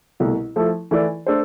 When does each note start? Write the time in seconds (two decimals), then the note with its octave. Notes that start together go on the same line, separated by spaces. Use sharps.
0.20 C2 B2 A3
0.56 F3 A3 E4 A4
0.91 E3 A3 E4 A4 D5
1.26 A3 D4 A4 C5